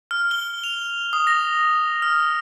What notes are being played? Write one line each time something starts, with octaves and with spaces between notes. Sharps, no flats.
F6
G7
F7
D#6
A#6
F6